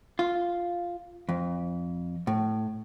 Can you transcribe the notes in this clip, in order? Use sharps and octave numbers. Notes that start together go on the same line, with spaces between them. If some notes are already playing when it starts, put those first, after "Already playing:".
F4
F2
A2